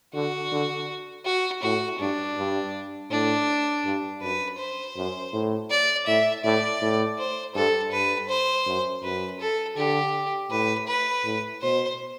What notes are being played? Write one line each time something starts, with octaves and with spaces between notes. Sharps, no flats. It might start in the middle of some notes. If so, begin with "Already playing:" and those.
D3 F#4
D3
F#4
A2 F#4
G2 D4
G2
A2 D4
G2
F#2 B4
C5
F#2
A2
D5
A2 E5
A2 D5
A2
C5
G2 A4
G2 B4
C5
F#2
F#2 B4
A4
D3 G4
A2 B4
B4
A2
B2 C5